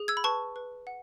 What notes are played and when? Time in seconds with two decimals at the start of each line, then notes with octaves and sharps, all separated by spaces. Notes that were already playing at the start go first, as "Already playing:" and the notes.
Already playing: G#4
0.08 E6 G#6
0.17 B5
0.24 B4 A5 C#6
0.56 B4
0.87 F#5